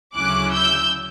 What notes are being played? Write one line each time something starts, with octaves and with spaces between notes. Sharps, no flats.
D2 C#3 F#3 C#4 E4 D6 F#6
E6 G6